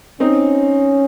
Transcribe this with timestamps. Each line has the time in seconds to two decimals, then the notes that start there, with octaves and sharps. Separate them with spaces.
0.20 C4 C#4 D#4